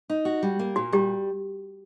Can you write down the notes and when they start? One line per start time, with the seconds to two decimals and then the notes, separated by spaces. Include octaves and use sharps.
0.10 D#4
0.25 F#4
0.43 G3
0.59 A#3
0.76 A#2 F#4
0.92 G3 G4